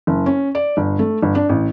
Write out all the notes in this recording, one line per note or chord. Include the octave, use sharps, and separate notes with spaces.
F#1
C#4
D5
G1
A3
G1
D4
A1